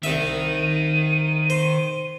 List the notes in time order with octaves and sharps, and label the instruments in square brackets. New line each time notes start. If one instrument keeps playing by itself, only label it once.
[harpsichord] C2 E5 [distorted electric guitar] D#3 [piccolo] D#7
[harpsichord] C5